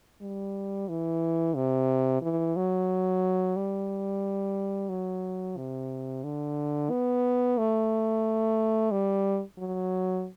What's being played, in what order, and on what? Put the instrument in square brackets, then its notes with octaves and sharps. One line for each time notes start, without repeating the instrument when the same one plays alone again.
[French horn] G3
E3
C3
E3
F#3
G3
F#3
C3
D3
B3
A3
G3
F#3